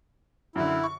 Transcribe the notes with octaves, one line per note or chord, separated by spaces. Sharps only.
F#2 D3 E4
C#6